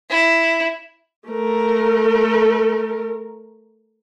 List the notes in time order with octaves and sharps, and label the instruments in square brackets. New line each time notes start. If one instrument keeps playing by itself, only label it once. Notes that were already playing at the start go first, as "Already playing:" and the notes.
[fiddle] E4
[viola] A3 A#4